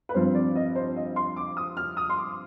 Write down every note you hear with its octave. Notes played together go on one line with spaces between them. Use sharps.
B4
G2 F3 C4 C5
D5
D#5
C5
D#5
C6
D6
D#6
F6
D#6
C6
D6